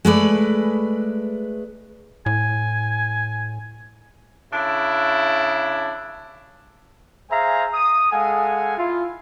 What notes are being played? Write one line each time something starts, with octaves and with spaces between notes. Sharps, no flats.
G#3 A3 B4 D5
A2 G#5
C#3 D4 E4
G#4 C5 E5 F5 G#5 A#5
D#6
G#3 A4 F5 F#5 G#5
E4 F4